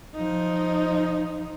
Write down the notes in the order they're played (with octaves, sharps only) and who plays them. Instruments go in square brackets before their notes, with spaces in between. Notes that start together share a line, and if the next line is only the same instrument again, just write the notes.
[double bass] F3 D#4